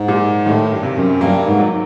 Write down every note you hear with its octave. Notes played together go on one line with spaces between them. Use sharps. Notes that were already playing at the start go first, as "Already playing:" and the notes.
Already playing: G#2
A#2
A2 D#3
G2
C3
F#2
G2 A#3
G#2
F#3